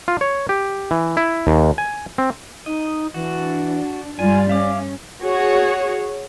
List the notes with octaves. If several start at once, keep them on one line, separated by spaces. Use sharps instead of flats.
F4
C#5
G4
E3
E4
D#2
G#5
C4
D#4 D#5
E3 D4 F#4
G2 G3 F4 D5 G#5
C#4 E5 F5 D6
F#4 G#4 C#5